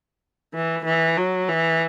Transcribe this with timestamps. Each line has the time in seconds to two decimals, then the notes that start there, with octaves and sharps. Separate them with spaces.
0.54 E3
0.85 E3
1.17 F#3
1.48 E3